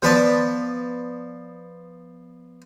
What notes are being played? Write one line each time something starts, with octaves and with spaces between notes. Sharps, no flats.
F3 B3 B4 D5 A5